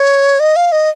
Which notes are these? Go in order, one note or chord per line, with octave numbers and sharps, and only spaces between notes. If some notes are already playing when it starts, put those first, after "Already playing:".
Already playing: C#5
D#5
F5
D#5